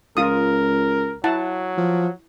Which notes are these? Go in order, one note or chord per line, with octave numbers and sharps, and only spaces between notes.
C#2 F4 A#4 D#6
F#3 E4 F#5 A5
F3